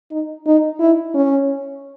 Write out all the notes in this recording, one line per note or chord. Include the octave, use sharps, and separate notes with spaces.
D#4
D#4
E4
C#4